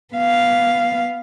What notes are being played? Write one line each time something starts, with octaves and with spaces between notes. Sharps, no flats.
B3 F5